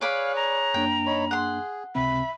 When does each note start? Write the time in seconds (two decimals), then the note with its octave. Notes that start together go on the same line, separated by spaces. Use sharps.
0.01 G#4 B4 C#5 D5 F5 B5 F#6
0.36 A#5
0.74 F#2 A#3 D4 G5
1.06 D#4 C#5 B5
1.31 G#4 F#5 C6
1.95 C#2 C3 C4 E5 B5